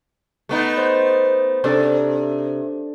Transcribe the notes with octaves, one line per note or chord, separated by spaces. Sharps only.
A3 B3 D#4
C5
C3 D4 A4